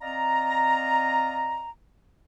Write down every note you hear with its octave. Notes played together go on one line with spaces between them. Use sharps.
C4 D5 D#5 F5 A#5